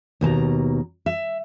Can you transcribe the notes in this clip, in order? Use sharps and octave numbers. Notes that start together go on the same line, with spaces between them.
D#2 B2 A5 A#5
E5